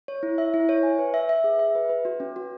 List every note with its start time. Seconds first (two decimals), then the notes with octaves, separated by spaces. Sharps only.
0.08 C#5
0.23 E4
0.38 E5
0.54 E4
0.69 C#5
0.83 G#5
0.98 B4
1.14 E5
1.29 E5
1.44 G#4
1.59 E5
1.75 B4
1.90 B4
2.05 F#4
2.20 C#4
2.36 F#4